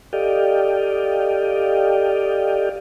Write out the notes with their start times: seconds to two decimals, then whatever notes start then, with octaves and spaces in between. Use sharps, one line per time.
0.13 G4 A4 D5 D#5 F5 G5